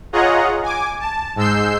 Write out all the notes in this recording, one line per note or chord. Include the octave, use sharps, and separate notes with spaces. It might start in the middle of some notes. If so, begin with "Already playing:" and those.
F4 G#4 C#5 D#5 F#5 A#5
G#5 D6
A5
G#2 G#3 E6 G6 C7